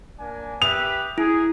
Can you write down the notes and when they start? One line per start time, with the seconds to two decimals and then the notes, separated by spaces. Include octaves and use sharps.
0.19 A#3 D4 G#5
0.62 G4 B4 E5 D#6 F7
1.18 E4 G#4